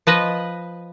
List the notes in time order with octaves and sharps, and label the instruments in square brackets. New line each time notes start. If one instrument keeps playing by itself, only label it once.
[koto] F3 B4 D#5